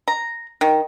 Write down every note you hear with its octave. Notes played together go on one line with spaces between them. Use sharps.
A#5
D#3